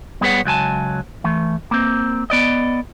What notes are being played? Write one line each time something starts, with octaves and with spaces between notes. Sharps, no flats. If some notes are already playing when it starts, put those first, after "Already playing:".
G3 B3 G#4 B4 C#5 F#5
C#2 F#3 G#5 A5
E3 A3
A#3 C4
B3 D5 D#5